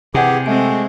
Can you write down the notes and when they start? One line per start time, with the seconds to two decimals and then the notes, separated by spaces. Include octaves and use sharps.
0.14 C3 E3 G4 G#4 D5 F#5 D6
0.46 G#3 A3 C4 G#5